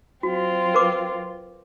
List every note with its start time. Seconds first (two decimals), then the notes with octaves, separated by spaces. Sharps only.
0.23 F#3 C4 F4 F#4
0.74 A#4 B4 D6